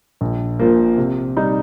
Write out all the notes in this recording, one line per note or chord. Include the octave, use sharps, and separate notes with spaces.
A#1
A#2 F3 A#3
C3
G3 D#4